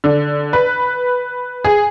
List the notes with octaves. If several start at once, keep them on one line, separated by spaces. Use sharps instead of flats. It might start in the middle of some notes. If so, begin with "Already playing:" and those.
D3
B4
G#4